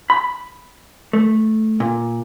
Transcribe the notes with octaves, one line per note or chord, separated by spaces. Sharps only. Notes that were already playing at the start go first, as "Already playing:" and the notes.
B5
A3
A#2